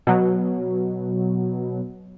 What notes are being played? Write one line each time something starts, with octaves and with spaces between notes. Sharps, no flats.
B2 F#3